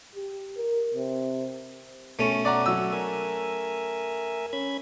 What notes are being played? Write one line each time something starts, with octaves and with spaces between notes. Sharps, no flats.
G4
A#4
C3
B2 A3 C#4
D5 F#5 A#5
F#3 E6
A#4 E5 G#5
C#4 B5 G#6